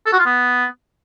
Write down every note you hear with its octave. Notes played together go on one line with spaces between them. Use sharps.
A4
F#4
F4
B3